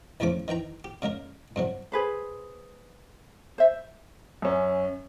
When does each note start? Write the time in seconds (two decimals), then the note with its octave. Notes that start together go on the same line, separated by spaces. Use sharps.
0.20 A#1 E2 C#3 F3 A3 D6
0.48 D#3 E3 G5 A#5
0.84 G4
1.02 C#3 G#3 A#3 A#4
1.56 G2 C3 F#3
1.92 G#4 B4 C5
3.58 C5 E5
4.42 F#2 C#4